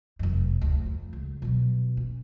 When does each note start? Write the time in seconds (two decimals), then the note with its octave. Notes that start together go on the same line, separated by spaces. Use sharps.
0.19 F1 F#2
0.62 D2
0.86 F2
1.13 C#2
1.42 B2 F#3
1.97 C#4